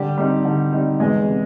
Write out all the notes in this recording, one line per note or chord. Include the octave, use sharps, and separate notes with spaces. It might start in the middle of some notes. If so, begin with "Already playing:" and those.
Already playing: D3 G3 G4
G3 C4 D#4
D3
G3 C4 D#4
E2 G#3 G#4
C3